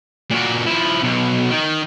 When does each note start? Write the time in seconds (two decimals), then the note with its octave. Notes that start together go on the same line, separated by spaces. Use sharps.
0.30 A#2 F#4
0.66 F3 E4
1.03 B1 B2
1.50 D#3